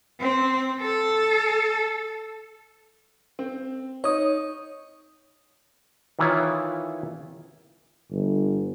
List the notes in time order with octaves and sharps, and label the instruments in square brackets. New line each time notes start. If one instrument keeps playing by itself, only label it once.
[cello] C4
A4
[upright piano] C4
[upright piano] D#4 [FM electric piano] C#5 D#6
[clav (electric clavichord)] D#3 E3 E4 F4 C#5
[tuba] G1